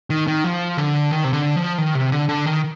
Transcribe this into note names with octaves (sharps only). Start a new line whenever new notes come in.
D#3
D#3
F3
D3
D#3
C3
D3
F3
D#3
C3
D3
D3
D#3